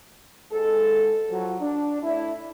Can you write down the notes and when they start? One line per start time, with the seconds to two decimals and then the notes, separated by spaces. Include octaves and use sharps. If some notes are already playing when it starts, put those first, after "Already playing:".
0.52 G#2 G#3 A4
1.30 F3 F#3
1.61 D4
2.02 A2 D4 E4